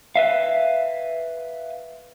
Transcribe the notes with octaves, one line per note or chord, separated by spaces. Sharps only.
B4 E5 F5